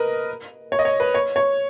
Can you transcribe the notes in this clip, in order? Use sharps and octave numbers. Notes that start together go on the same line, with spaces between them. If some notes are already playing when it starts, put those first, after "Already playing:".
Already playing: A#4 B4 D#5
C#5
D#5
C#5
B4
C#5
C#5